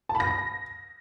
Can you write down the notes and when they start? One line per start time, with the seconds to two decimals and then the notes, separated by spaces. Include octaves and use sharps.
0.09 A5
0.15 B5
0.20 A#6